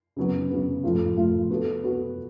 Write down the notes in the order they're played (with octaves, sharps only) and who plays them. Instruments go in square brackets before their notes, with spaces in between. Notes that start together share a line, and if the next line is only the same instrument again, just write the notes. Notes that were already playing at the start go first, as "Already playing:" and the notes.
[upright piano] C#3 F#3 B3
C#3 F#3 B3
A2 F3 A3 F4
A2 F3 A3 F4
B3 F#4 A4
B3 F#4 A4